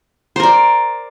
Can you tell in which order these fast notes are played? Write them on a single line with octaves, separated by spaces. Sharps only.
C5 A#4 D5